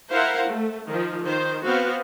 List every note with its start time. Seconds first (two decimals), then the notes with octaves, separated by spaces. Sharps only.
0.13 E4 A#4 C5 F5 F#5
0.49 A3
0.90 D#3 F3
1.23 D#3 C5
1.65 B3 C4 F#4 F5